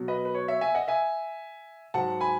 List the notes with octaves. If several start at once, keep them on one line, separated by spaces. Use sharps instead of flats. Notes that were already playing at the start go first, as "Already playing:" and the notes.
Already playing: B2 F#3
B4 D#5
B4
C#5
C#5 E5
E5 G#5
D#5 F#5
E5 G#5
G#2 F#3 F#5 A5
G#5 B5